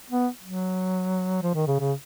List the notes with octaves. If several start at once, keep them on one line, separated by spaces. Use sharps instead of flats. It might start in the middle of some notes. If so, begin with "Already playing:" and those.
B3
F#3
F3
D#3
C#3
C#3